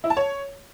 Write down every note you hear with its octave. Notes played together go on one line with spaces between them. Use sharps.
E4
A5
C#5